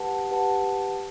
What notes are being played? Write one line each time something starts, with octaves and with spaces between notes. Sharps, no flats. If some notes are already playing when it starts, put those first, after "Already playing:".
Already playing: G4 B4 F#5 A5
G4 B4 F#5 A5